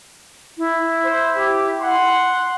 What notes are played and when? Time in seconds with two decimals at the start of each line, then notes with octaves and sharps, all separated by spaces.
0.58 E4
1.04 C5
1.36 G4
1.81 F#5 C6